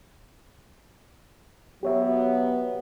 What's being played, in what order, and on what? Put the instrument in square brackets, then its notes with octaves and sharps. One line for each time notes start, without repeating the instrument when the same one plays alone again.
[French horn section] F#3 B3 [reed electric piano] G4 C#5 E5